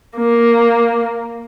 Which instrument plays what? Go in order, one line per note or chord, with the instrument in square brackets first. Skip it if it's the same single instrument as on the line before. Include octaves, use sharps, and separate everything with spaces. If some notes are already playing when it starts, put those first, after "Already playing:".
[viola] A#3